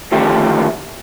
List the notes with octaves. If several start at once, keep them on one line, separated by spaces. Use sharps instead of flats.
D2 D#3 F3 A3 G4 E5